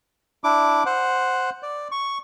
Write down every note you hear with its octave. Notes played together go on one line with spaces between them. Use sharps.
D4 E4 D6
C5 F#5
D5
C#6